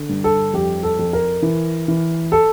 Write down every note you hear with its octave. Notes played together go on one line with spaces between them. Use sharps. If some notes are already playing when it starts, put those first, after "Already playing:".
Already playing: D3
G2
A4
F2 G4
A4
F2
A#4
E3
E3
A4